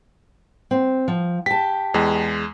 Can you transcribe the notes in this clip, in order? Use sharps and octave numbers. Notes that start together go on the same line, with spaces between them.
C4
F3
G4 A5 B6
E2 G#3